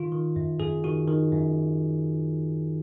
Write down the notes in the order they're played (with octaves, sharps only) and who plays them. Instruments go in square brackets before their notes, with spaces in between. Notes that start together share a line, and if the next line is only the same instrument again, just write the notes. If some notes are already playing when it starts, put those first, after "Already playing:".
Already playing: [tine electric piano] D#3 F4
D#3
F#2
F#2 G#4
D#3 F#4
D#3
F#2